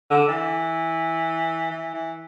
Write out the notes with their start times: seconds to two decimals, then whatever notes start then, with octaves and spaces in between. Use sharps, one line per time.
0.10 D3
0.28 E3
1.71 E3
1.94 E3